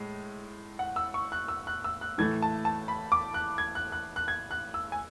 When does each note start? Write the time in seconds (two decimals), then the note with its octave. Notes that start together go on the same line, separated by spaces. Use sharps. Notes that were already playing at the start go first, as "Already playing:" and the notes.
Already playing: A2 G#3
0.79 F#5
0.96 E6
1.14 C#6
1.32 F#6
1.48 E6
1.67 F#6
1.84 E6
2.01 F#6
2.18 A2 E3 A3 G#6
2.42 A5
2.65 A5
2.88 B5
3.12 D6
3.34 F#6
3.58 G#6
3.75 F#6
3.92 F#6
4.16 F#6
4.28 G#6
4.51 F#6
4.74 E6
4.92 G#5